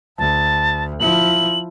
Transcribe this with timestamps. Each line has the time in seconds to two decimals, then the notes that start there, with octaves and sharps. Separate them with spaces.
0.18 D2 A5
1.00 F3 E4 F#7